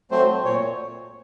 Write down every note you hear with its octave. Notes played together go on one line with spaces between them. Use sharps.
F#3 A3 C4 C5
A#2 C#5